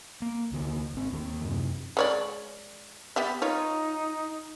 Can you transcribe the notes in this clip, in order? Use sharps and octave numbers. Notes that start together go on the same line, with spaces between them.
A#3
D2 D3 A#3
G#1 C4
D#2 D#3 G#3 A#3
F#2 C3
G#3 C#5 D5
B3 G4 E5
D#4 F4 C#5